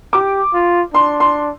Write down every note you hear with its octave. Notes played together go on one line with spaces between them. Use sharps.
G4 D6
F4
D4 C6
C6